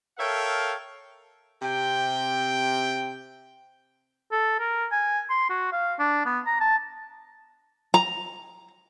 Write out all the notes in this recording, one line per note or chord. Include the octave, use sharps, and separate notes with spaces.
A4 A#4 C#5 E5 F5 G5
C3 G5
A4
A#4
G#5
C6
F#4
F5
D4
B3
A#5
A5
A#5